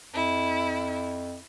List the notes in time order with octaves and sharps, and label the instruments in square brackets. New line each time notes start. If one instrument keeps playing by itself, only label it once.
[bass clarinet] F2 [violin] E4